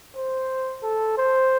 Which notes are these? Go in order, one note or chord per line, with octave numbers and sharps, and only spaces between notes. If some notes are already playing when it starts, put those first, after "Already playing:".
C5
A4
C5